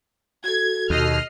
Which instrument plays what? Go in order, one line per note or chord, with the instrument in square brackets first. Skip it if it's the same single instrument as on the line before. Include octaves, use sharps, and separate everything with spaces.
[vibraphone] F#4 A4 [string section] G#6
[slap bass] D#2 [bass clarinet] B2 [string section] D#5 F6 C7